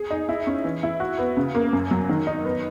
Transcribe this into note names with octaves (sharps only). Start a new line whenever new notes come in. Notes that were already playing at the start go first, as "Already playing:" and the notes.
Already playing: G#4
D#4
E4
C#4
E3
E4
F#4
B3
C#3
A#3
F#2
F#3
D#3
D#4
B3